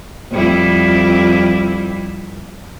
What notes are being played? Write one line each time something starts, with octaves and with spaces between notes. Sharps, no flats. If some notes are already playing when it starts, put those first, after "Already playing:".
F2 G3 E4